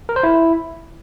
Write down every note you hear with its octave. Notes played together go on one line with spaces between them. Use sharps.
A#4
C5
E4